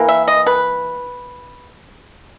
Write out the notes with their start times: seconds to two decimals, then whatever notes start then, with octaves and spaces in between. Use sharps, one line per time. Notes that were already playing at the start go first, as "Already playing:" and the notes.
Already playing: E3 A#3
0.09 E5
0.28 D#5
0.47 B4